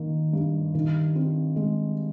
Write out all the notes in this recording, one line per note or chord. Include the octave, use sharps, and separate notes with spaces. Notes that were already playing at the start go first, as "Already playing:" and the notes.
Already playing: D#3 A#3
G2
D#3
C4
G#3